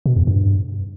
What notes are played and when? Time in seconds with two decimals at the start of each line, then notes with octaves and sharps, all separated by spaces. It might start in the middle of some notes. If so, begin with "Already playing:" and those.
0.06 B2
0.16 E2
0.27 G2